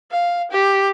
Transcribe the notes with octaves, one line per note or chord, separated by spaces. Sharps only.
F5
G4